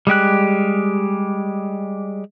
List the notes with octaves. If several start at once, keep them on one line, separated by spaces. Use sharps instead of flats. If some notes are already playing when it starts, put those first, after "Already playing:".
G3 G#3 G4 F#6